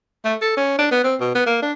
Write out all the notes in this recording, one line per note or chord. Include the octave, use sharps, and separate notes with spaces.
A3
A4
C#4
D4
B3
C4
B2
B3
A#3
D4